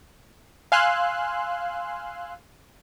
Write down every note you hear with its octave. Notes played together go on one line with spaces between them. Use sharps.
F5 G#5 C6 E6 F#6